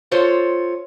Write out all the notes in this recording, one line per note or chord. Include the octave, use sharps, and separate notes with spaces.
F4 A4 C5 C#5